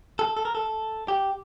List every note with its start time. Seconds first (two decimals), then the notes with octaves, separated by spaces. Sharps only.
0.19 A4
0.37 A4
0.45 A#4
0.55 A4
1.08 G4